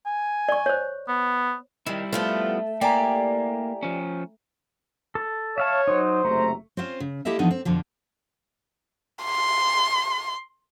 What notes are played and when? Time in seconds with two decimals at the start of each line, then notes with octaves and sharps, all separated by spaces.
0.06 G#5
0.49 D5 C#6
0.66 C5 C#5
1.08 B3
1.87 D#3 G3 E4
2.13 F3 A3 B3 F4
2.81 A#3 E4 G4 D5 G5 G#5 A#5
3.83 F3 C#4
5.15 A4
5.58 C#5 E5 F5 A5
5.87 F#3 D#4 C5
6.25 F#1 C3 A3 A#5
6.77 C4 C#4 F4 C5 F5
7.00 C#3
7.25 A#3 E4 G4 A4 D#5 E5
7.39 E3 F3 B3 D4 D#4
7.51 C4
7.65 F2 B2 D3 F3
9.24 C6